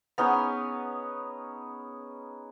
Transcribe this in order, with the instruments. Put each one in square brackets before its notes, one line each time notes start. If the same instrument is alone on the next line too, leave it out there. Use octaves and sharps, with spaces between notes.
[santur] B3 C#4 D#4 G#4